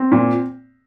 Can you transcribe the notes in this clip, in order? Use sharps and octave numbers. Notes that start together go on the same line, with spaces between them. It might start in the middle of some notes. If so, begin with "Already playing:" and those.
Already playing: C4
A#2